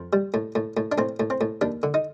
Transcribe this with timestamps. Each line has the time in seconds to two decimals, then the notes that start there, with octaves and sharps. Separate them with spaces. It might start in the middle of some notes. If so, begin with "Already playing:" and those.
Already playing: F2
0.13 G3
0.34 A2
0.55 A2
0.77 A2
0.92 D4
0.98 A2 C4
1.20 A2
1.30 C4
1.41 A2
1.61 D#2 D4
1.83 D3
1.94 D#4